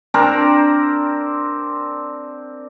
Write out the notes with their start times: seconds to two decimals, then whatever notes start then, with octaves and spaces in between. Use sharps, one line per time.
0.14 C4 D4 A#4